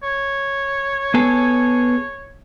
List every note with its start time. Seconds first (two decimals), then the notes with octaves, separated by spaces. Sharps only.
0.03 C#5
1.14 B3 G#4 A4